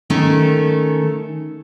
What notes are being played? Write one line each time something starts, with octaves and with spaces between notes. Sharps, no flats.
D#3 A3 C#4